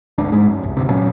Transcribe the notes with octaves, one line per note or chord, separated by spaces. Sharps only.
G#1 D2 D4
G#2 G#3
F#2
C2
G1 D2 C3
A#2 F#3 C#4